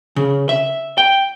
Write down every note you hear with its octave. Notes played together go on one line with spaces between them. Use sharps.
C#3
E5
G5